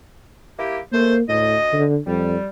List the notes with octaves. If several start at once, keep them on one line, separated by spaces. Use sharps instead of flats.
A#3 E4 G4
C#2 A3 A#3 C5
D2 A2 D#5
D3
F2 G3